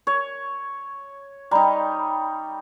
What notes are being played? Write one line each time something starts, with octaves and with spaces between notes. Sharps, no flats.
C#5
G3 D#4 G5 A#5 B5